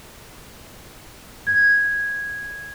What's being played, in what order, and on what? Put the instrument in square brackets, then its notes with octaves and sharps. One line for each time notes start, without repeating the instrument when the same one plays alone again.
[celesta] G#6